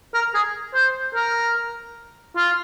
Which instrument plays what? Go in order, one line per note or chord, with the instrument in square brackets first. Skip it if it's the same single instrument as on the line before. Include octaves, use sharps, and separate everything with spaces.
[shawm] A#4
G#4
C5
A#4
F4